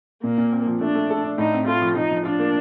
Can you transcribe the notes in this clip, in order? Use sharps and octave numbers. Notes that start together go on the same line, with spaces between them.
A#2 A#3
A#2
C4
F3
A3 D4
A3
A4
D4
A2 D#4
C4
A3 F4
F3
F3 D#4
F3
D4 F4
A#3